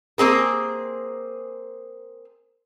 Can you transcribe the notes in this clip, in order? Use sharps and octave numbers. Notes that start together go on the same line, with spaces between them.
A#3 C4 G#4 A#4